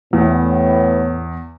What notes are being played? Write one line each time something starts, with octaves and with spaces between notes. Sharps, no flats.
E2 A2 B3